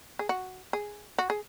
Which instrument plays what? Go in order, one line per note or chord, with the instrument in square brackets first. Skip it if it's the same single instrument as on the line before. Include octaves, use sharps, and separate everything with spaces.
[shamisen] G#4
F#4
G#4
F#4
G#4